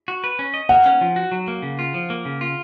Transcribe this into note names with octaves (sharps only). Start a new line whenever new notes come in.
F#4
B4
C#4
D#5
A#3 F#5
C#4
F3
F#4
F#3
A#3
C#3
F4
F3
A#3
C#3
F4